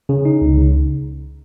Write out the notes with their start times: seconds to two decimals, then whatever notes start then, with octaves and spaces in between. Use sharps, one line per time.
0.09 C#3
0.25 D#4
0.41 C#2
0.58 C#3